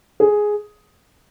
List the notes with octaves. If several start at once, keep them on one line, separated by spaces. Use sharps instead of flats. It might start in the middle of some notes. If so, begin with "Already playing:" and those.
G#4